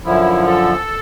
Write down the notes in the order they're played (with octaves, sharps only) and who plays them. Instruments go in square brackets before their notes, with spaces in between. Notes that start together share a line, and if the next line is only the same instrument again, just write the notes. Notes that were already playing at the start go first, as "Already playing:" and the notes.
[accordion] F#2 D3 F3 E4
A4